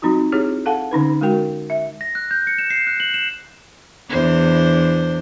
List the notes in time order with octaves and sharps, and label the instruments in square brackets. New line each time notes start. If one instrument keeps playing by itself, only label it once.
[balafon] F#3 C4 D#4 F4 F#4
C4 E4 F4 G4 G#4 C#5
A4 F5 F#5 A5
D3 C#4 D#4 B4
G#3 F#4 A#4 G5
E5
[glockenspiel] A#6
F#6
G6
C#7
E7
C7
F#6
F#7
E7
[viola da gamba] E2 D4 C5